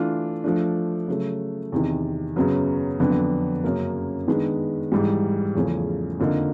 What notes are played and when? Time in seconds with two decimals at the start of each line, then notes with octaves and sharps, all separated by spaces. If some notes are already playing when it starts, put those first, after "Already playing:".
Already playing: E3 A3 D4 F4
0.44 F3 A3 D4
1.08 C#3 F#3 A3
1.72 E2 C3 D#3
2.36 F#2 C#3 F#3 B3
2.99 F2 D3 F#3 B3 D4
3.64 F#2 C#3 F#3 A#3
4.27 D#3 G#3 B3 D4
4.92 G#2 E3 G3
5.55 E2 C#3 F3 A3 C#4
6.20 F2 D3 F3 A#3 D#4